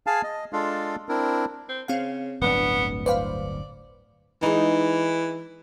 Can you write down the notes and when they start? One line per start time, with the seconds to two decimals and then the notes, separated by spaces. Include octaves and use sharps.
0.07 G#4 F5 G#5 A5
0.23 D#5
0.53 G#3 D4 F4 A4 F5
1.09 C4 D4 E4 A#4
1.69 C4
1.88 C#3 C4 F5
2.42 D1 G1 B3 D4
3.06 B4 C5 D5 F5
4.43 E3 G#3 D#4